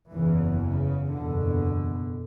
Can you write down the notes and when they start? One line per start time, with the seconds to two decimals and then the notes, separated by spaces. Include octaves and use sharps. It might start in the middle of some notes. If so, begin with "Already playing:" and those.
0.11 F#1 E2 C#3 E3
0.61 C#3
1.11 F#1 E2 B2 D3